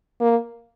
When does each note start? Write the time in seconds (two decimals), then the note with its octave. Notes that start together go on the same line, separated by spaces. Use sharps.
0.21 A#3